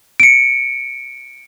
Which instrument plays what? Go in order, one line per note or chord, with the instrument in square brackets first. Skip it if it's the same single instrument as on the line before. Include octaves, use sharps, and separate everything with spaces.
[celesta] C#7 D7